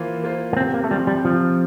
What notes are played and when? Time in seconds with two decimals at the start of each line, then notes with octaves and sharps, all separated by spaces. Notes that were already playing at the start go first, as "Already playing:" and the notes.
Already playing: E3 A#3 F4 C5
0.23 A#3 F4 C5
0.53 A#3
0.57 C3 C4
0.74 A#3
0.84 A3
0.90 F3 G3 C4
1.07 G3
1.24 C3 F3